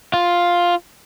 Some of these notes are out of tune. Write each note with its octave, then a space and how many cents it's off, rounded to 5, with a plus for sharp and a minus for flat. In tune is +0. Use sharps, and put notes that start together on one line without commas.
F4 +5